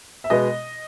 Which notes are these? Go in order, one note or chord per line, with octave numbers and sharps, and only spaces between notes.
E5
B2 G#3 B3 D#5